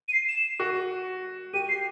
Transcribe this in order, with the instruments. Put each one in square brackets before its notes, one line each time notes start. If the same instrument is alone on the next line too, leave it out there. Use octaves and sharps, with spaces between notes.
[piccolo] D#7
C7
E7
[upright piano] F#4
[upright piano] G4 [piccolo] D#7
[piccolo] C7